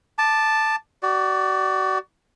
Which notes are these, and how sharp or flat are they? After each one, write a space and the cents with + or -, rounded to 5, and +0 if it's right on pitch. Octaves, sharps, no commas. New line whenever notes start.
A5 +0 D6 +20
F#4 +35 D5 +5